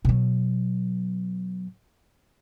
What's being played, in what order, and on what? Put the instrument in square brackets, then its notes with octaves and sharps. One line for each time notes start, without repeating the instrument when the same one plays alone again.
[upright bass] B2 F#3